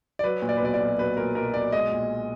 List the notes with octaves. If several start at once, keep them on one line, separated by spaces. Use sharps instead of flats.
D5
F#3 B4
A#2
D5
B4
B1 D5
D5
B1
F#3 B4
A#2 A#4
B1 A#4
B1 D5
G#3 D#5
A#2